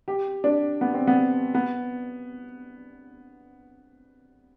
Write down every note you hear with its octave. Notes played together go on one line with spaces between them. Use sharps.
G4
D4
B3
C4
B3
B3